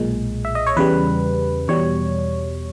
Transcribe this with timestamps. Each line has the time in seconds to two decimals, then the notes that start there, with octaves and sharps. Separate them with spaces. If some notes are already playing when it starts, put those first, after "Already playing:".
Already playing: B1 A#2 G#3
0.45 E5
0.55 D#5
0.67 C#5
0.77 E2 C#3 G3 B4
1.68 E2 B2 G3 C#5